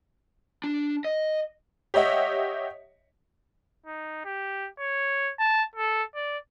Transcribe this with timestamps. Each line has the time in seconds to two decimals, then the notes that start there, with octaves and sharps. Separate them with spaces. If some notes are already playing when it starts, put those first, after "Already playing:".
0.64 D4
1.04 D#5
1.94 G4 C#5 D#5 E5 F#5
3.86 D#4
4.25 G4
4.80 C#5
5.39 A5
5.75 A4
6.15 D5